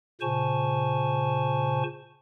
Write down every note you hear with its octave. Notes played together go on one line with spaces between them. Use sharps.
A#2 C#3 C5 G#5 A5 C#6